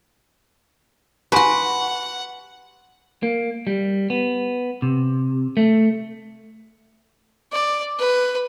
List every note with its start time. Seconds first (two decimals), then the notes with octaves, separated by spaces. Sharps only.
1.32 F#4 G4 B4 F#5 G#5 C6
3.23 A#3
3.67 G3
4.10 B3
4.82 C3
5.57 A3
7.52 D5
7.99 B4